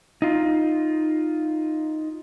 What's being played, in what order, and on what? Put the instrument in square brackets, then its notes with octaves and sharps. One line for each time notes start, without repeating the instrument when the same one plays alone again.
[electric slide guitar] D#4 F4